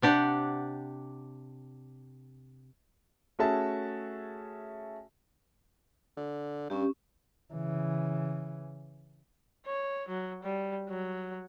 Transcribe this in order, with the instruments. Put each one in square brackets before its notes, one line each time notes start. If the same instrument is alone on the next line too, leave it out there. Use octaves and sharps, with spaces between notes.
[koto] C3 D4 G4 F#5
[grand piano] A3 C#4 F#4 G#4 E5 A5
[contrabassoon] D3
[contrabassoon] G2 [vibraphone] C#4 G4
[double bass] C#3 E3
[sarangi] C#5
F#3
G3
F#3